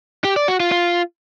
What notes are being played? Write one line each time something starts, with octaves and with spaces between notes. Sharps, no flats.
G4
D5
F#4
F4
F4